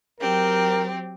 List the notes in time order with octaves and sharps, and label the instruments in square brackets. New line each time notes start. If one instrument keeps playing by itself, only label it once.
[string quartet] F#3 C4 G4 [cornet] A#4